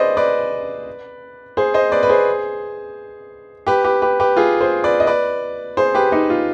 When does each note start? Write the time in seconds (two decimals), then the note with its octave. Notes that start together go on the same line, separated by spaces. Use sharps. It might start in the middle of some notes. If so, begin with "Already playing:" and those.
Already playing: G#4 B4 C5 D5 D#5
0.17 B4 D5
1.57 G#4 C5
1.74 C5 D#5
1.92 B4 D5
2.03 B4
2.09 G#4 C5
3.67 G4 B4
3.84 G4 B4
4.02 G4 B4
4.20 G4 B4
4.37 F4 G#4
4.61 G#4 C5
4.84 B4 D5
5.00 D#5
5.07 B4 D5
5.77 G#4 C5
5.95 G4 B4
6.12 D#4 G4
6.30 F4